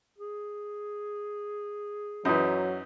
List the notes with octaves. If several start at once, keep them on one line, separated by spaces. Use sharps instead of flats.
G#4
F#2 E3 F#3 D#4